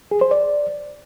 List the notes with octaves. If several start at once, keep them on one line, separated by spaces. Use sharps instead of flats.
G#4
C5
D5